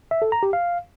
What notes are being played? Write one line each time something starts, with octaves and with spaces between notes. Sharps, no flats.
E5
A4
A#5
G4
F5